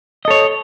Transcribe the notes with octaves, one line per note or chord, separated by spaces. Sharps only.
A4 C#5 D#5